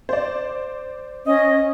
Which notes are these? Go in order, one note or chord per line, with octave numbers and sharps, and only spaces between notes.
C5 D5
C#4 D#5